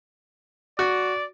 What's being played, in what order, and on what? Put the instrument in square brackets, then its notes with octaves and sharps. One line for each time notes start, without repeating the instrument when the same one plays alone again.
[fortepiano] F#4 [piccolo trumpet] D5